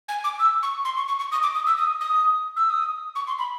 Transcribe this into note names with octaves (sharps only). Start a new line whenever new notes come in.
G#5
D6
E6
C#6
C6
C#6
C#6
C#6
D#6
D6
D#6
E6
D#6
D#6
E6
D#6
C#6
C6
B5